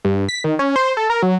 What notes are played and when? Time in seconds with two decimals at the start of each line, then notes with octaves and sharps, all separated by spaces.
0.05 G2
0.29 B6
0.44 D#3
0.59 C#4
0.76 C5
0.97 A4
1.10 A#4
1.22 F#3